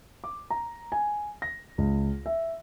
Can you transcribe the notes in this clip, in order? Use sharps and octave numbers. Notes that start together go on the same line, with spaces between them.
D6
A#5
G#5
A#6
C#2
E5